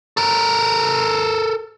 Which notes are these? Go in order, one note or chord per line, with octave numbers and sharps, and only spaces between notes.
A4 A#4